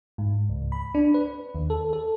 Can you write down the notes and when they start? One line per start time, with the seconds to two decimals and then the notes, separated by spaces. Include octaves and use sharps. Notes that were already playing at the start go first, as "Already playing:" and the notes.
0.18 G#2
0.49 C#2
0.72 B5
0.94 D4
1.14 B4
1.55 D#2
1.70 A4
1.93 A4